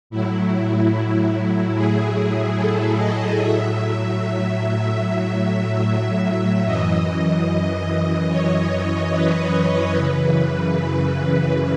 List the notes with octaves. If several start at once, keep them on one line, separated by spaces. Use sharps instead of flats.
A2 F#3 E4
G#4
A4
D#5
A2 F#3 E5
E5
F#2 E3 D#5
C#5
B4
F#2 C#3 E3